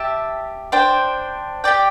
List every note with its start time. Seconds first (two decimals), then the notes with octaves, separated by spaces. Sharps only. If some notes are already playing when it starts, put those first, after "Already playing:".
Already playing: G4 E5 A5
0.72 D4 C5 G5
1.64 G4 D5 G5